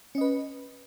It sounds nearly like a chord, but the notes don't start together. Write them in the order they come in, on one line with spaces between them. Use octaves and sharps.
C#4 D#5 B4